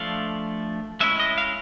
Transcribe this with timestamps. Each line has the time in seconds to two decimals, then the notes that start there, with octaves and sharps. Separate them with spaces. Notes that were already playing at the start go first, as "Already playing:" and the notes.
Already playing: F3 A3 D4 F5
1.00 G#3 C#4 E4 E5
1.20 D#5
1.38 F5